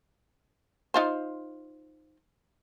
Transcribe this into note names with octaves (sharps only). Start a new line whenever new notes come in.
D#4 F4 C5